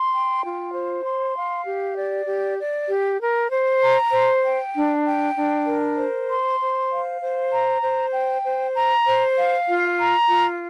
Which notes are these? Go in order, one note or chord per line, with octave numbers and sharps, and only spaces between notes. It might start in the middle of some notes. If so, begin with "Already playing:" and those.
Already playing: C6
G5
F4
C5
C6
F5
G4
D5
G4
D5
G4
A#4
C5
A#5
C5
G5
D4
G5
D4
A#4
C5
C6
C5
F5
C5
A#5
C5
G5
C5
A#5
C5
F5
F4
A#5
F4